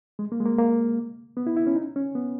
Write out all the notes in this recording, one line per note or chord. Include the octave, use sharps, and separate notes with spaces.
G#3
A#3
G#3
A#3
A#3
B3
E4
E4
C#4
D#4
C#4
B3